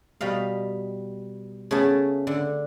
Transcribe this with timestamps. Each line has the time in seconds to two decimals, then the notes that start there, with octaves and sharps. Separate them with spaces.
0.21 B2 G3 B4 D#5 F5
1.71 C#3 A3 B3 G#4 A5
2.27 D3